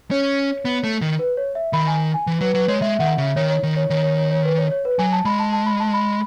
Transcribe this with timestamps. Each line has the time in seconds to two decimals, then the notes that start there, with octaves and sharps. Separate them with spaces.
0.11 C#4 C#5
0.65 B3
0.84 A3
1.02 D#3
1.19 B4
1.37 C#5
1.55 E5
1.73 D#3 B5
1.87 G#5
2.14 G#5
2.27 E3
2.41 F#3 B4
2.55 F#3 B4
2.68 G#3 C#5
2.82 G#3 E5
2.95 E5
2.99 D#3 F#5
3.18 C#3 E5
3.36 D#3 C#5
3.50 C#5
3.63 D#3
3.76 C#5
3.90 D#3 C#5
4.03 C#5
4.17 C#5
4.31 C#5
4.44 B4
4.58 C#5
4.71 C#5
4.85 B4
4.99 F#3 G#5
5.12 A5
5.25 G#3 B5
5.39 A5
5.53 A5
5.66 B5
5.80 A5
5.93 B5